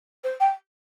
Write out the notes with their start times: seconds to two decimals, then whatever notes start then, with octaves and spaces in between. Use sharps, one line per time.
0.23 C5
0.40 G5